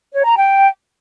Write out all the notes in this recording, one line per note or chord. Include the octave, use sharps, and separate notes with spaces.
C#5
A#5
G5